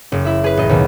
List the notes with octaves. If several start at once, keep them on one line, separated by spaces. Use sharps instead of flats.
F#1
E4 E5
G#4 B4
A1 D#5
D#2 B2